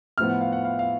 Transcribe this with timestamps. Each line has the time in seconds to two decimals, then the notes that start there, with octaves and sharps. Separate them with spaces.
0.18 A2 F3 B3 F6
0.29 F#5
0.41 F5
0.53 F#5
0.64 F5
0.79 F5